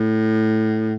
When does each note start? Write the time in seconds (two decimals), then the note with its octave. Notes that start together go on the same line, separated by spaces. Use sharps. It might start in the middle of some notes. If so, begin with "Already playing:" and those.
Already playing: A2